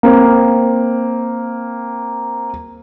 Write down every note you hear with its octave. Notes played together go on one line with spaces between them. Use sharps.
A#3 C4